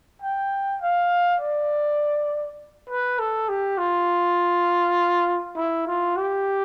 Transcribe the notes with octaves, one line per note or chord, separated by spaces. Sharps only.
G5
F5
D5
B4
A4
G4
F4
E4
F4
G4